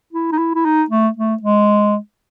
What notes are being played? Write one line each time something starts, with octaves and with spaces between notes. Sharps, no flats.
E4
D#4
E4
E4
D#4
A3
A3
G#3